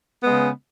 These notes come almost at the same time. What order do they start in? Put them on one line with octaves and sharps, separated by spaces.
B3 G#3 C#3